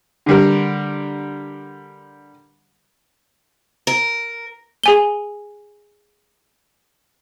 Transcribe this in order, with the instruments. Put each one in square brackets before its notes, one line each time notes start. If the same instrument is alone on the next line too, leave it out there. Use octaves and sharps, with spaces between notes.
[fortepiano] D3 G3 A#4
[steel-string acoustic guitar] A#4
[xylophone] G#4 G#5 G7